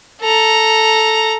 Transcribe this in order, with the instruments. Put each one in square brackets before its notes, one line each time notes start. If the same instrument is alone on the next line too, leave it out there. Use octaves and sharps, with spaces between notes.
[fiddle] A4 A#5